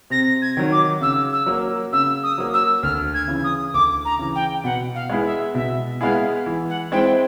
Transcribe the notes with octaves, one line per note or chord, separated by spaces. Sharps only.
C3 A#6
G#6
D#3 F#3
D6
C#3 E6
E6
F#3 A#3
C#3 E6
D#6
F#3 A#3
E6
D2 F6
G#6
C#3 E3
D#6
D2 D6
A#5
C#3 E3
G5
B2 F#5
F5
G#3 B3 E4 G#4
E5
B2 E5
G#3 B3 E4 G#4 F5
E3
F#5
G#3 C4 E4 G5